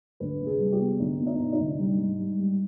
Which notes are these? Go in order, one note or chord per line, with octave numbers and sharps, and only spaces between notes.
D2 B4
C3
G#4
G3
G4
B3
D2 D#4
B3
D#4
C3
D#4
D2
G3
G#2
G3
G3